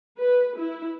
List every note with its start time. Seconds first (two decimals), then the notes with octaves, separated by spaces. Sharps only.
0.18 B4
0.58 E4